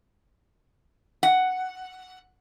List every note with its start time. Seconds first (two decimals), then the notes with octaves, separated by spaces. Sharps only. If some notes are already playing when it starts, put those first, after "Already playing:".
1.23 F#5